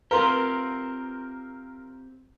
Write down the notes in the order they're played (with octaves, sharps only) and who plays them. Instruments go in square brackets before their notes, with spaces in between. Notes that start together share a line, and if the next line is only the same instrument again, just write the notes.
[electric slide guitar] C4 F4 G4 [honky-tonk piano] A#4 [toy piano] B4 F5 C6